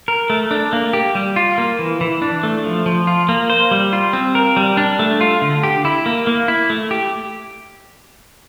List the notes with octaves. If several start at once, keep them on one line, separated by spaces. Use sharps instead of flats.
A#4
A3
D4
A#3
G4
G3
F4
A#3
E3
E3
D4
A3
F3
F3
F4
A#3
C5
G3
F4
C4
A#4
G3
D4
A3
F4
D3
G4
E4
A#3
A#3
E4
A3
G4